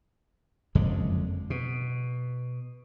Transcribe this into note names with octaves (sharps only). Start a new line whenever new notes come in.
F#1 F2 D3 G#3
B2